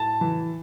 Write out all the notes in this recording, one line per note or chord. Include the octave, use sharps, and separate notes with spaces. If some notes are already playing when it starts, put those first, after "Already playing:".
Already playing: A2 A5
E3